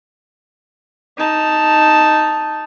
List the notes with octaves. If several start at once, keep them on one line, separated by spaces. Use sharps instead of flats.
D#4 A5